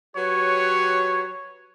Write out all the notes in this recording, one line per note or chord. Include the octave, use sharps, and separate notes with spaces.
F#3 G4 B4 C#5